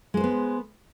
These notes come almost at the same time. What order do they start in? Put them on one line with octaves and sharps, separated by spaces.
G#3 C5 B4 B3